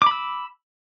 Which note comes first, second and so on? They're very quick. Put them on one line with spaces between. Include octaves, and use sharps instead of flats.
D6 B5 E6